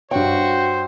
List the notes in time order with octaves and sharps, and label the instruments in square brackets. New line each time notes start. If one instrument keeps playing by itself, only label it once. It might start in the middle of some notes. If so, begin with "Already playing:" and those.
[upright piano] G2 C#5 [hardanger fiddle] F#4 [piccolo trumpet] C5 [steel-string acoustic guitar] G5